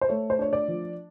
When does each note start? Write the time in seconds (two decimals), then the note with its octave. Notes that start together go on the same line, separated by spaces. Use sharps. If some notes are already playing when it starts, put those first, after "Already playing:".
0.01 C5
0.09 A3 C#5
0.30 C5
0.39 D4 C#5
0.53 D5
0.68 F3